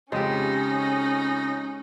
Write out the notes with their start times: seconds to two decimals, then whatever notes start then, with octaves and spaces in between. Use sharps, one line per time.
0.12 F2 C#3 G#3 C#4 D#4 G4